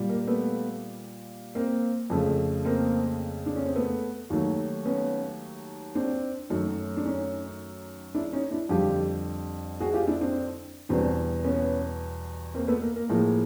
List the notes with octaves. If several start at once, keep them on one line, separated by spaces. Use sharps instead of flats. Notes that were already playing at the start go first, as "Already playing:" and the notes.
Already playing: A#2 G3
A#3
A3 B3
A#3 C4
F2 C#3 F3 A3
A#3 C4
D4
C#4
C4
A3 B3
D#2 D#3 F#3 A3
B3 C#4
C4 D4
F#2 D#3 F#3 A3
D4
C#4 D#4
D4 E4
C#4 D#4
D4 E4
F2 D3 G3 F4 G4
F#4 G#4
F4 G4
D4 E4
C4 D4
E2 B2 G3 C4 D4
B3 C#4
A#3 C4
A3 B3
A#3
A#3
A2 F3 G#3 A#3